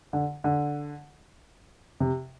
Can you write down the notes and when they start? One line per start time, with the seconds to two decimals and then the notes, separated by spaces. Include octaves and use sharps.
0.13 D3
0.44 D3
2.00 C3